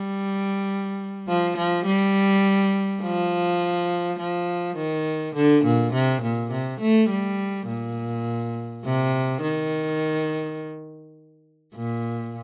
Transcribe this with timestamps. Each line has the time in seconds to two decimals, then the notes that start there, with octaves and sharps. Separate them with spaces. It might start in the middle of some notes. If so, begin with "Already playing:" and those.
Already playing: G3
1.27 F3
1.56 F3
1.86 G3
3.02 F3
4.19 F3
4.76 D#3
5.35 D3
5.64 A#2
5.93 C3
6.22 A#2
6.51 C3
6.80 A3
7.10 G3
7.67 A#2
8.84 C3
9.42 D#3
11.75 A#2